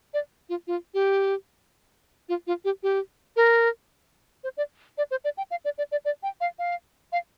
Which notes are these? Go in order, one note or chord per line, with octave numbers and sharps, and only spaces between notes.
D5
F4
F4
G4
F4
F4
G4
G4
A#4
C5
D5
D5
C5
D5
G5
F5
D5
D5
D5
D5
G5
F5
F5
F5